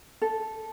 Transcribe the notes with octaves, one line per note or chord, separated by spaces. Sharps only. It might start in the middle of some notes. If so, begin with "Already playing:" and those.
A4